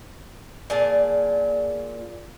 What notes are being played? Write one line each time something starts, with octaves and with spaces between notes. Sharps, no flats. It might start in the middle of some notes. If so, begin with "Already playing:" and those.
A#2 G#4 A5